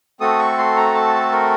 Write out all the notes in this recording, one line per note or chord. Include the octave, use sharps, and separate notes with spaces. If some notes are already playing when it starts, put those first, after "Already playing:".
A3 C4 F#4 A4 D#6
C#6
C6
A#5
A5
A#4